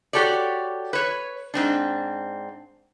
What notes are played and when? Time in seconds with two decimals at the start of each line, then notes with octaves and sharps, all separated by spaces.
0.13 F#4 G4 A4 C#5 D5
0.93 B4 C#5
1.54 G#2 C4 D4